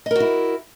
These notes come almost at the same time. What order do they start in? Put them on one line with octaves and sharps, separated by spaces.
D#5 A#4 F#4 E4